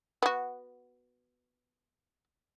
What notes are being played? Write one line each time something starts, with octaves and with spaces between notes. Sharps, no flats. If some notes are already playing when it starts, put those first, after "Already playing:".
B3 F#4